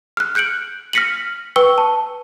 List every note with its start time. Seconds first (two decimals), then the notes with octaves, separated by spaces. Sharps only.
0.17 F6 F#6
0.35 F#6 G6 C#7 D7 F#7
0.93 F6 A#6 B6 C#7 D#7 F#7
1.56 B4 G5 C#6 E6 G7
1.78 A5